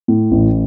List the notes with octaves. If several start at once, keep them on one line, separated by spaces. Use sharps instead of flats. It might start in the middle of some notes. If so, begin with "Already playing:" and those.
A2
A1